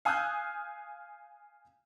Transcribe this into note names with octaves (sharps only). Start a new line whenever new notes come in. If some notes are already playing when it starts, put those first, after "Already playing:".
F5 G#5 D#6 E6 F#6 G6